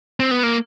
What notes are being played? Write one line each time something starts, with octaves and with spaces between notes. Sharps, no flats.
C4
B3
A#3